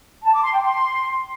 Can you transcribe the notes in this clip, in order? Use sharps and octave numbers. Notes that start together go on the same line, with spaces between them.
A5
D6
C6
G5
C6